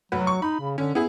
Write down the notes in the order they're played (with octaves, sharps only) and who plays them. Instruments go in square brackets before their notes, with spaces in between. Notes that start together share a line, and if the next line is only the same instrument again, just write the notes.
[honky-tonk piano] F1 F#4 B4 [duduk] F#3
[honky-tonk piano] C#6
[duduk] D#4 [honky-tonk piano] B5
[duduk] C#3
[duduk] D3 [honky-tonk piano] C#4
[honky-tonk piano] B3 G#4 [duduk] E4